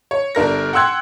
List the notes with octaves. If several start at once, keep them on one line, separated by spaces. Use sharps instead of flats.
C#5
G1 D4 A#4 A#6
F#5 G5 C6 E6 F#6 G#6